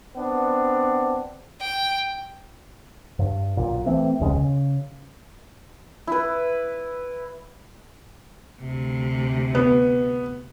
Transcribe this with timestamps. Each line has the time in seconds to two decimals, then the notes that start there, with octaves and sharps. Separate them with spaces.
0.16 B3 C4 D4
1.60 G5
3.19 G2
3.57 B1 A#2
3.86 E3 A3 C4
4.20 E1 C#2 C#3 G#3
4.34 C#3
6.07 E4 B4
8.60 D2 C3
9.55 B3